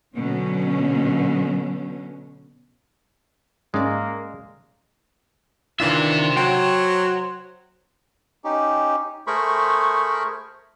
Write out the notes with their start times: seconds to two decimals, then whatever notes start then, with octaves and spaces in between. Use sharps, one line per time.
0.14 B2 D3 F#3 C#4
3.74 G#2 G#3 A#3 C#4 D5
5.80 D#3 E3 D4 F4 C5 E5
6.36 F#3 F#4 G5 C6
8.44 C#4 D#4 G4
9.27 A3 G#4 A#4 C5 B5 C#6